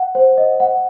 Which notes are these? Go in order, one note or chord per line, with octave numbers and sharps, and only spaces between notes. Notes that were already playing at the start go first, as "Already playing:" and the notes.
Already playing: F#5
C5
D#5
F#5